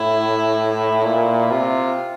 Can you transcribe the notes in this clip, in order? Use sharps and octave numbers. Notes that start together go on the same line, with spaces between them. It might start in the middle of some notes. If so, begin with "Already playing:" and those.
Already playing: A2 E4
A#2 E4
C3 F4